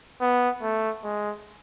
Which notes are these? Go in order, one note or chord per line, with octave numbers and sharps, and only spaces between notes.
B3
A3
G#3